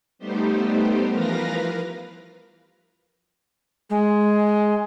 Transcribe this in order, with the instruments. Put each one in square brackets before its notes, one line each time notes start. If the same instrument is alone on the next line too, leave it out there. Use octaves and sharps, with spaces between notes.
[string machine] G3 A3 B3 D#4 G4 C5
E3 F3 A#4 B4 F5 A#6
[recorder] G#3